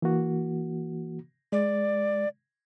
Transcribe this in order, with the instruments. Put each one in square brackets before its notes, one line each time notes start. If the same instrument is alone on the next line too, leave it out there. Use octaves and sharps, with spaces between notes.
[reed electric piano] E3 A#3 F#4
[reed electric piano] G#3 [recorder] D5